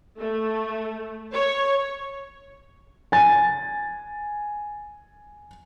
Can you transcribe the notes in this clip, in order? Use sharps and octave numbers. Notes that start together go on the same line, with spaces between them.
A3
C#5
G#5 A6